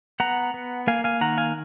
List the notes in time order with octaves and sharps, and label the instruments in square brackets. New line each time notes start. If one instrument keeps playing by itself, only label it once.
[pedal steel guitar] B3 F#5 A#5
B3
A#3 F5 G#5
F5 G#5
D#3 F#5 A#5
F5 G#5